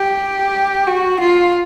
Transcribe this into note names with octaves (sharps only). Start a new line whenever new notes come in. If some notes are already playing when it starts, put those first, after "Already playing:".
Already playing: G4
F#4
F4